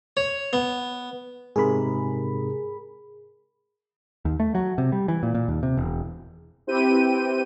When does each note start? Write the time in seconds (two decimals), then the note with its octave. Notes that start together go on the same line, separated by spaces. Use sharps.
0.17 C#5
0.53 B3
1.56 G#2 C3 G#4 A#4 B5
4.25 D#2
4.40 A3
4.55 F#3
4.78 C3
4.92 G3
5.08 E3
5.23 A#2
5.34 A#2
5.48 D#2
5.63 C3
5.77 E1
6.67 C4 E4 G4 B4 G5 D#7